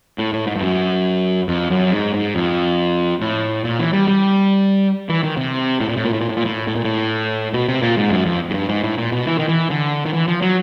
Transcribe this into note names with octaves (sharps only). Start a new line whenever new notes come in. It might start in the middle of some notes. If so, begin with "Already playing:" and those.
A2
A2
G#2
G2
F#2
F2
F#2
G#2
G#2
F2
A2
A#2
E3
G3
G3
E3
D#3
C3
A2
A#2
A2
A#2
A2
A#2
A2
A#2
A2
A2
A#2
A2
B2
C3
A#2
G#2
F#2
F2
G#2
G2
G#2
A2
A#2
B2
E3
D#3
E3
D3
D#3
E3
F3
F#3